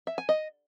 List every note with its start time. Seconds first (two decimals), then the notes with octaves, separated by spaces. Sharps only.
0.07 E5
0.18 G#5
0.29 D#5